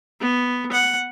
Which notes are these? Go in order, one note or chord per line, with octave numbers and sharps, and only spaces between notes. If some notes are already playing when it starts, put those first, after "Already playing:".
B3
F#5